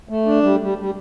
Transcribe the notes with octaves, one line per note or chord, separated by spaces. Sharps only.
A3
D4
G3
G3
G3